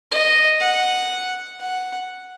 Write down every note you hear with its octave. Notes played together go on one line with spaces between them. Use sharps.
D#5
F#5
F#5